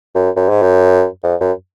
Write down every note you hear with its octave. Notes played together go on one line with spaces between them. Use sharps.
F#2
F#2
G#2
F#2
F2
F#2